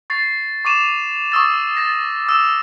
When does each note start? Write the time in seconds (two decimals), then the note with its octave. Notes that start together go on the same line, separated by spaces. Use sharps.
0.10 C#6 A6 C7
0.65 C#6 D6 D#7 E7
1.32 C#6 D#6 E6 A6
1.75 A6 A#6 E7
2.27 D6 E6 E7